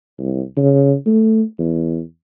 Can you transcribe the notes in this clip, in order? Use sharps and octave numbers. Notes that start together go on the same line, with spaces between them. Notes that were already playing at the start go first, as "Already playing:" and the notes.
C2
C#3
A3
E2